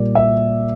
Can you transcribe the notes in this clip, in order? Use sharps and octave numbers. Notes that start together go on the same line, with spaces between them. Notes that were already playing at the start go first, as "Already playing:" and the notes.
Already playing: A#2 G3 A#3 D5
E5